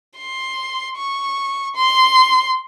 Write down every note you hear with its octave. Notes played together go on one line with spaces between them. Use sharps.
C6
C#6
C6